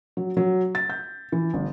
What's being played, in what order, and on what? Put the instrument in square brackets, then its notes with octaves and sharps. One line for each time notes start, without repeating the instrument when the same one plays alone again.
[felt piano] F#3
F#3
A6
G6
E3
G1